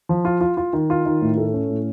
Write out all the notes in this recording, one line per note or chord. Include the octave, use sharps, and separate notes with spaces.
F3
F4
F4
F4
D#3
F4
D#3
A2
A3
C#4
A2